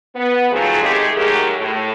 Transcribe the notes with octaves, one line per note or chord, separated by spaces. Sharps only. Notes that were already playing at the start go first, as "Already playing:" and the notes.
B3
D#3 F3 F#3 A3 C4 G#4
D#3 G#3 A3 G4 G#4
D#3 F#3 G#3 A3 G4 A#4
A2